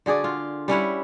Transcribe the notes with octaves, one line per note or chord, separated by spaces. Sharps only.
D3 F#4 G#4 D5
F4
G3 C#4 E4 F#5